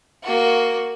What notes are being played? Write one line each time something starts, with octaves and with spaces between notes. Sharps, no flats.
A#3 F#4